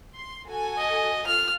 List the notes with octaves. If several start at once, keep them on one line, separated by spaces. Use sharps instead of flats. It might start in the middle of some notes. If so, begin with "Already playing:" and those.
C6
F#4 A4 G#5
D#5
F4 F6